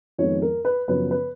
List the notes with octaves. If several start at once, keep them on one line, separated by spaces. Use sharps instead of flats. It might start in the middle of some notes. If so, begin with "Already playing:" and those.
F2 D#3 G#3 B3 C#5
A#4
B4
F#2 C#3 F3 B3 B4
B4